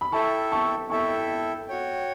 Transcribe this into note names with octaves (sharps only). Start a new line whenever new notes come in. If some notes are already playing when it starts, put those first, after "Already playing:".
B5
E4 A4 E5 G5 A5 C#6
A5 C#6
E4 A4 E5 G5 A5 C#6
F#4 C#5 G5